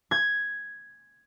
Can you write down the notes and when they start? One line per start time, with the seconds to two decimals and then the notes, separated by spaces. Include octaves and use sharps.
0.11 G#6